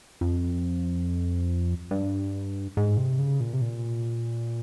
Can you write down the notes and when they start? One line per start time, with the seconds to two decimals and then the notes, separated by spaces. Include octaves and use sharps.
0.21 F2
1.91 G2
2.77 G#2
2.97 C3
3.19 C#3
3.40 A#2
3.53 C3
3.62 A#2